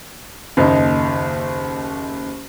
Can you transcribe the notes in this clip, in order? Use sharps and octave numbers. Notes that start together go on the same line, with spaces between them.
F#1 D#2 D#4